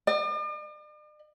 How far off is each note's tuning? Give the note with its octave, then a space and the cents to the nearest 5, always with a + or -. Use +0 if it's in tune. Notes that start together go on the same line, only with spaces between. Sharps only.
D5 +45